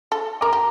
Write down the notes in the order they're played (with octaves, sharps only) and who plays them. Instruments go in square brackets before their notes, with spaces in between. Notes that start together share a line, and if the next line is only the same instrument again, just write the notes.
[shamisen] A4
[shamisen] A#4 [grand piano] A#5 D6
[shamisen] G4